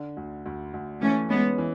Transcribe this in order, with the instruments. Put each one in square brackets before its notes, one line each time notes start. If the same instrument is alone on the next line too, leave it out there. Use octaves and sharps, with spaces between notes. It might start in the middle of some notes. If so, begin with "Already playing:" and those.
Already playing: [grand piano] D3
D2
D2
D2
[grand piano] E3 [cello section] A3 C#4
[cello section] G#3 B3 [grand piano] C#4
[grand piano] E3